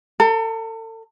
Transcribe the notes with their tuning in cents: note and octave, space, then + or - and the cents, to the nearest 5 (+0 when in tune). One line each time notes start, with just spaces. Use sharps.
A4 +35 A#5 +0